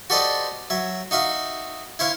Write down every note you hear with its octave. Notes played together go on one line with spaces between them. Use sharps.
F#4 G4 A4 C5 D5 D#5
F#3 E5
D#4 F#4 E5 F5
E4 C5 C#5 F5